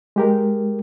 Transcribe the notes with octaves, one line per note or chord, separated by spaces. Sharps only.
G#3 G4 A#4